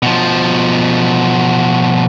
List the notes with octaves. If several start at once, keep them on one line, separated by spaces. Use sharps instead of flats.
B2 F3